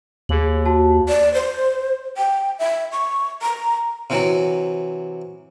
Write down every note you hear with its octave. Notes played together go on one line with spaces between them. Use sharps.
D#2 G#4 F#7
F#4 A5
D5
C5
G5
E5
C#6
A#5
C3 E3 F#3